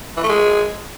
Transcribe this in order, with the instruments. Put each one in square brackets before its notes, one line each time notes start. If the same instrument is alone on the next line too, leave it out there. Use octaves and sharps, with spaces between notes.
[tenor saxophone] E3
A3
G#3